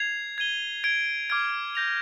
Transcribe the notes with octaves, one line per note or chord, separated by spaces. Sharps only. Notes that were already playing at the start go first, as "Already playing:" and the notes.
Already playing: G#6 C7 F7
G#6 D#7 G7
G#6 D7 G7
D6 F6 G#6 D7
G6 A#6 F7